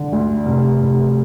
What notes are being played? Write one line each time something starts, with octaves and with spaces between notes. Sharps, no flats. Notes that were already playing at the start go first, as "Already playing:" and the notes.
Already playing: D3
D2
F1
F1